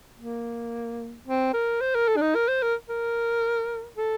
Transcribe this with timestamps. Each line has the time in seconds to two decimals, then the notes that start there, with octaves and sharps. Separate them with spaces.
0.19 A#3
1.26 C4
1.54 A#4
1.81 C5
1.95 A#4
2.08 A4
2.17 D4
2.21 D#4
2.35 A#4
2.48 C5
2.62 A#4
2.89 A#4
3.97 A4